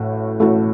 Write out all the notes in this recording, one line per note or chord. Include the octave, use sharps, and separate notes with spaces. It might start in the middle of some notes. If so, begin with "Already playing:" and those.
Already playing: A1 A2 A3 F#4
A1 A2 A3 F#4